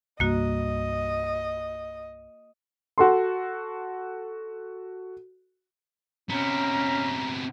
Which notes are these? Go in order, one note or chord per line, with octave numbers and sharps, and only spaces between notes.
C2 G2 A#3 F#4 D#5
F#4 A4 C6
C3 B3 C#4 A#5